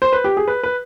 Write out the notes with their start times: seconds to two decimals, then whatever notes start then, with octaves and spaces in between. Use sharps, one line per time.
0.02 C5
0.13 B4
0.24 G4
0.37 G#4
0.48 B4
0.63 B4